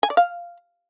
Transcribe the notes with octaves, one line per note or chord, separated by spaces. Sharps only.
G#5
D5
F5